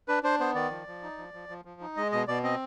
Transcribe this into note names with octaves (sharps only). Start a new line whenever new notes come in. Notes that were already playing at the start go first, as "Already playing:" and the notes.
D4 B4
D4 C5
B3 C5
D#3 D5
F3
F3
D#4
F3
F3
F3
F3
D#4
G#3 D#5
B2 D#5
B2 D5
C4 D#5